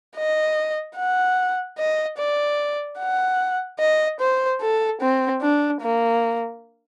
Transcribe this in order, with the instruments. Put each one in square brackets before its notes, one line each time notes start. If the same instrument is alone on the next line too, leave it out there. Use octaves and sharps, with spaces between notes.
[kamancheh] D#5
F#5
D#5
D5
F#5
D#5
C5
A4
C4
D4
A#3